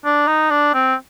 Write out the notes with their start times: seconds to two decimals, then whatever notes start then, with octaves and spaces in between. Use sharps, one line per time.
0.05 D4
0.27 D#4
0.50 D4
0.74 C4